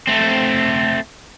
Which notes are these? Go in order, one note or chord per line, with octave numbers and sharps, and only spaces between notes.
A3 C4